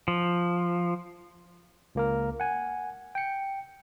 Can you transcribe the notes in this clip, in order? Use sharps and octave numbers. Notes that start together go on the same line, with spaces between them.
F3
C#2 A#3 A#4
F#5 G#5
G5 C#7